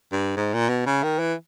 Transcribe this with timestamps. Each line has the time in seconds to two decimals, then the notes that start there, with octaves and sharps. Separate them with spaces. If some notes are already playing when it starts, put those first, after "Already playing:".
0.12 G2
0.36 G#2
0.53 A#2
0.69 B2
0.86 C#3
1.03 D#3
1.19 E3